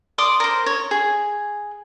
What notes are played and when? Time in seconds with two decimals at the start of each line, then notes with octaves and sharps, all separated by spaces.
0.18 D5 C6 D6 D#6
0.40 A#4 C5
0.66 C#5
0.91 G#4